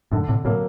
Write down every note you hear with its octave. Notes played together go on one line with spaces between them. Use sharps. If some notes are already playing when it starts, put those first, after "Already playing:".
F#2 A2 D3
A2 C3
A2 C3 F#3 A#3